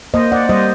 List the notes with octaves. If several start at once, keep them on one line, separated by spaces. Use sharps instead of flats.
A#3 C5 D#5
D5 F#5
G3 C5 D#5